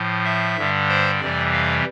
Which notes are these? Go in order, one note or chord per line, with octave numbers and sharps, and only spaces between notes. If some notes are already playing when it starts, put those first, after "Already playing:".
Already playing: A2 F3
E5
G2 D3 G3
C5
F2 C3 E3 G3 D5
F5